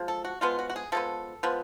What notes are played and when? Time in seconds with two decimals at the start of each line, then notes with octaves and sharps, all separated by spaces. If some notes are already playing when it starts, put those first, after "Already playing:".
Already playing: F3 G#3
0.08 A4
0.25 F#4
0.41 F3 G#3 B3 F4
0.59 F#4
0.70 F#4
0.76 G#4
0.92 F3 G#3 B3 A4
1.43 F3 G#3 B3